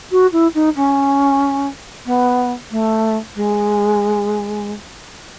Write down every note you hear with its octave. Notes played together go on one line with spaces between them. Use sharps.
F#4
E4
D#4
C#4
B3
A3
G#3